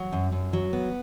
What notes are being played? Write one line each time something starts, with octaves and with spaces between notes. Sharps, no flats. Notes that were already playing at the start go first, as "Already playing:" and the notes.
Already playing: F#3
F#2
F#2
F#3
B3